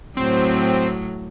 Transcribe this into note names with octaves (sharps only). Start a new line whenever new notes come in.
A2 F#3 C4